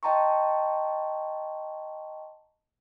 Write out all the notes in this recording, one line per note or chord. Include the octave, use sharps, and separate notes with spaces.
D#5 G5 A5 A#5 C6 C#6